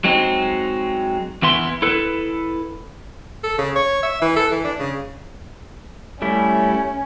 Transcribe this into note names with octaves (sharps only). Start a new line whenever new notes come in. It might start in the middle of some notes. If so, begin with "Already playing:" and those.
F#3 G#3 C4 D#4
E2 E3 B3 E4 C6
E4 A4 B4
A4
C#3
C#5
E5
E3
A4
E3
D4
C#3
G3 A3 C#4 E4